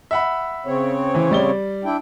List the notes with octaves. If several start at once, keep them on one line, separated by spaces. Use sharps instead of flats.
E5 F#5 B5
C#3 C4 C#5
E3
G3 D5 G7
D4 E4 G5